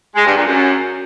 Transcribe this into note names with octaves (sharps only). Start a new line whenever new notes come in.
G#3
G2
A#2
F#2